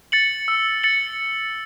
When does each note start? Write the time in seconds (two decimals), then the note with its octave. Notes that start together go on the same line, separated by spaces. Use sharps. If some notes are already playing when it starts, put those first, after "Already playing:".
0.12 A6 C#7 F#7
0.48 E6
0.83 A6 C#7 F#7